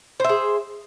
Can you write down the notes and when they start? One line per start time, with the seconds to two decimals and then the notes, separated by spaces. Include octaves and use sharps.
0.20 C5
0.24 E5
0.29 G#4